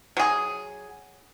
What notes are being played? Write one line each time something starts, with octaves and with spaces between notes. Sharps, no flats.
F#3 G#4